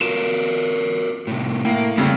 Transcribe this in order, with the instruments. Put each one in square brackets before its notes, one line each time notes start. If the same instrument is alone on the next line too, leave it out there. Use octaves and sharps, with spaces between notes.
[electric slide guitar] F4 F#4 A#4 [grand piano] E7
[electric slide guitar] A2 C3
[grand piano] A2 [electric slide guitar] A#3
[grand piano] F2 C#3 G3 [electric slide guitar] A3 C4